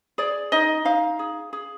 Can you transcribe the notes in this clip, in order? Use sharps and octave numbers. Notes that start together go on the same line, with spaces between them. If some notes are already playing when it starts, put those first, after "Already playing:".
G#4 D5
D#4 D#5
D#4 F5
G#4
G#4